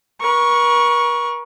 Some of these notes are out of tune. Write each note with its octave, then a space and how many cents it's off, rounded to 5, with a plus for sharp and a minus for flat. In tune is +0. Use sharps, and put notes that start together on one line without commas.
A#4 +45 C#6 +0